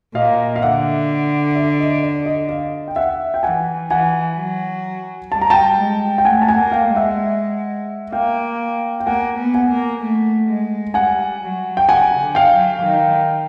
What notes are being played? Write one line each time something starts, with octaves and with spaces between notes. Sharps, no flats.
A#2 D#5 F5
F5
D3 E5 F#5
D5 E5
D#5
D5
D#5
D#5 F5
G5
E5 F#5
G5
E3 F#5 G#5
E3 F#5 G#5
F#3
G3 A5
A#5
G5 A5
G#3
G5
A3 F#5 G#5
A5
F#5 G#5
A#3
F5 G5
G#3
E5 F#5
A#3 F5 G5
G5
A#3 F#5 G#5
B3
F#5 G#5
A#3
A3
G#3
G3 F#5 G#5
F#3
G5
C#3 F#5 G#5
D3
F5 G5
F#3
D#3